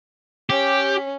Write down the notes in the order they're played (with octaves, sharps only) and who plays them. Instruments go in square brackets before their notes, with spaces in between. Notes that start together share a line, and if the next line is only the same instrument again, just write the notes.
[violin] C#4 [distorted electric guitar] G4